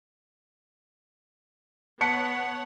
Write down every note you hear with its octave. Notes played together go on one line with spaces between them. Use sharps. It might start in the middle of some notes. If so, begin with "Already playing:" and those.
B3 C#5 F#5 A5 B6 C#7